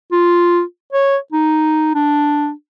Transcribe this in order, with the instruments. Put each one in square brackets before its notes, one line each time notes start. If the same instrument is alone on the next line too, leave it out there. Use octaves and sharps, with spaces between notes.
[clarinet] F4
C#5
D#4
D4